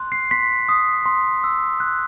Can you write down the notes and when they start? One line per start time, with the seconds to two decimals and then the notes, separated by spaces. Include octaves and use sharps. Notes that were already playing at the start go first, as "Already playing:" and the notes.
Already playing: C6 F#6
0.12 C7
0.31 C6 B6
0.69 D#6
1.06 C6
1.44 E6
1.80 F#6